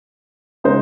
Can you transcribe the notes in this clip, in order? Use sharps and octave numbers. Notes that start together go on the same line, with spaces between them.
C#3 G#3 D#4 G#4 C5